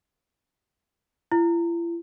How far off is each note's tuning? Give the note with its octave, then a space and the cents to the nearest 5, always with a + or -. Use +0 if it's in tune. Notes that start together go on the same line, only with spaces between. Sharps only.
E4 +45